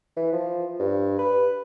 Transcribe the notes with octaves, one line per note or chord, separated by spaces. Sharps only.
E3
F3
G2
B4